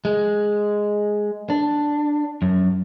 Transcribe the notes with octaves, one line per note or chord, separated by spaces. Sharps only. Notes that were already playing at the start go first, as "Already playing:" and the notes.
G#3
D4
F#2